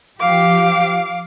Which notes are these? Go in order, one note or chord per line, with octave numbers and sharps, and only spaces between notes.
F3 G4 F5 D6